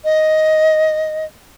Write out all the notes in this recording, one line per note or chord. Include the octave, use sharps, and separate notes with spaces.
D#5